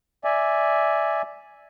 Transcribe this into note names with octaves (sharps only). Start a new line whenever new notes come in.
D5 E5 G#5